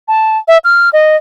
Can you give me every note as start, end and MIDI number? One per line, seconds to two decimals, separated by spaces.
0.08 0.38 81
0.48 0.58 76
0.64 0.90 89
0.93 1.16 75